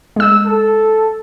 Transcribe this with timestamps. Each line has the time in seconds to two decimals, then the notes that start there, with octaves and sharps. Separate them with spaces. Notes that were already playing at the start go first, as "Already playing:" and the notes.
0.16 G#3 E6
0.45 A4